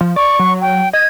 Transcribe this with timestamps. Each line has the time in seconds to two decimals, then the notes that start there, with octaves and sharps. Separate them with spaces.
0.01 F3
0.16 D5 C#6
0.39 F#3
0.61 G5
0.93 D#5 G#6